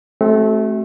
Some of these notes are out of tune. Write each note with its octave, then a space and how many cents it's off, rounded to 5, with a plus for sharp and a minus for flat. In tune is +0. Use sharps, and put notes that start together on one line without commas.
A3 -20 C4 +25 F#4 +35